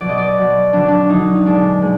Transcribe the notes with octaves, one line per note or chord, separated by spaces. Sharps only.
B2 F#3 D5
D#5
D5
B2 F#3
D3 F#3 D4
D4
D3 F#3 D#4
D#4
B2 G#3 D4
B2 G#3